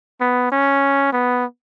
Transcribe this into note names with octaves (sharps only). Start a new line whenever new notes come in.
B3
C#4
B3